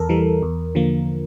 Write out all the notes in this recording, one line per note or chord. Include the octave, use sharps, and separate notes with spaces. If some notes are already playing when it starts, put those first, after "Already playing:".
Already playing: E2 A4 A#4
E3 G3
E2
D3 F3 A#3